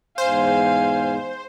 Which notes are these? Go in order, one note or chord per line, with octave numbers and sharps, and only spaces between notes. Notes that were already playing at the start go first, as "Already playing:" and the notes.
E2 G#2 C5 F5 G#5